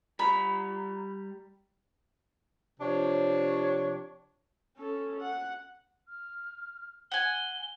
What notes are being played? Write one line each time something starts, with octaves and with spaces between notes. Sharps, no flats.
G3 A#5 B5
C3 F3 D4 C#5
C#4 A4
F#5
F6
F#5 G#5 G7